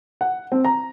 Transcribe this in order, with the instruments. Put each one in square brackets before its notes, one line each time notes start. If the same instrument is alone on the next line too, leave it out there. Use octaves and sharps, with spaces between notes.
[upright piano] F#5
C4
A#5